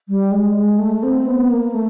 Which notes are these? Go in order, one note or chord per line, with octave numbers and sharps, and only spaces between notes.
G3
G#3
G#3
A3
C4
B3
A#3
A3